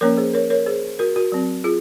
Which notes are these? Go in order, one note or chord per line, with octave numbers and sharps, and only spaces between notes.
F3 A#3 C#4 A#4 C#5
G#4 C5
A#4 C#5
A#4 C#5
G#4 C5
F#4 A#4
F#4 A#4
F#3 C4
F4 G#4